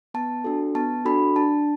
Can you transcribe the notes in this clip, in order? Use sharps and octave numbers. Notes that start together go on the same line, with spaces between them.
B3 A5
D4 F#4 A4
B3 A5
D4 F#4 A4 B5
D4 A5